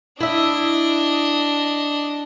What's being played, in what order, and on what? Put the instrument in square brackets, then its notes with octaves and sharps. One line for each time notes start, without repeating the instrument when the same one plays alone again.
[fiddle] D4 D#5 [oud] E4 E5